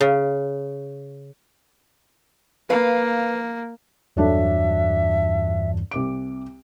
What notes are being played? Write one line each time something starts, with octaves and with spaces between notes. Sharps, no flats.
C#3
A#3 B4 F5
E2 G2 F#3 D4 A4 E5
C2 D6 D7